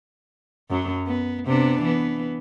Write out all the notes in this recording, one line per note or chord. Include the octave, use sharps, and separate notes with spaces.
F#2 F#3
B3
C3 B3 D4
E3 B3